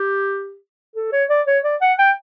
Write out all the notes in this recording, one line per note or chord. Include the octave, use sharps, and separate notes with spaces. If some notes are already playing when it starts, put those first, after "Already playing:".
Already playing: G4
A4
C#5
D5
C#5
D5
F#5
G5